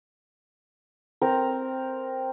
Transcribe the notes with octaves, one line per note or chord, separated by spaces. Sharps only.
C4 A#4